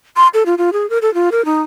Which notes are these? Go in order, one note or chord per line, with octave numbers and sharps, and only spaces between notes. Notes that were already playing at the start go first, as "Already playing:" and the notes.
C6
A4
F4
F4
G#4
A#4
A4
F4
A#4
D#4